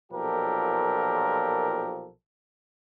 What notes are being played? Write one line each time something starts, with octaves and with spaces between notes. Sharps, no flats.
B1 A#2 F3 G4 A4 A#4